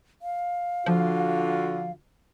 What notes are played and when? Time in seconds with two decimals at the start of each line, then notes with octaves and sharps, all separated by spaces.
0.22 F5
0.86 D3 F3 F4 F#4